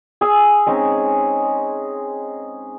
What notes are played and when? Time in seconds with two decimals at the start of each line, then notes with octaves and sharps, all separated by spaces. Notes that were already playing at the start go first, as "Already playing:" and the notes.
0.21 G#4 E6
0.66 G#3 C4 C#4 D#4